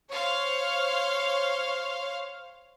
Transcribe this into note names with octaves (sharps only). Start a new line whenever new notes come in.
C5 C#5 F5